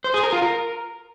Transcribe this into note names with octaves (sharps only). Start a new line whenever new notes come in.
C5
G#4
A#4
F4
A#4